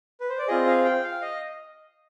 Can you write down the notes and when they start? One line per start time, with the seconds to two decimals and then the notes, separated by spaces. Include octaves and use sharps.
0.20 B4
0.29 C5
0.38 D5
0.48 C4 F4 G#4 D#5
0.67 F5
0.84 G5
1.03 F5
1.22 D#5